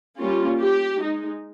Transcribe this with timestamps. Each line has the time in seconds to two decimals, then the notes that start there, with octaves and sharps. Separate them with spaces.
0.18 G3 A#3 C#4 F4
0.59 G4
0.99 G#3 D#4